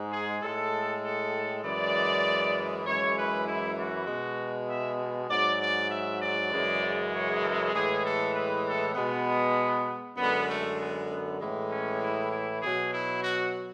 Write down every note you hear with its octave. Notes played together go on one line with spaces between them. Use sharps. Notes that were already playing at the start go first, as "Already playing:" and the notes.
Already playing: G#2 G#3
G#4
A2 G#3 A4
A4
F#2 E3 G#3 D5
F#2 E3 G#3 C#5
B4
E4
F#4
B2 G#3
E5
G#2 F#3 D5
D5
E5
D5
F#2 C#3 E3 G#3
C#5
A4
A2 E3 G#3 G#4
A4
B4
A4
B2 G#3 B3
F#2 D3 G#3 B3
A3
B3
B3
A2 E3 G#3
C#4
E4
E4
B2 F#3 G#4
E4
F#4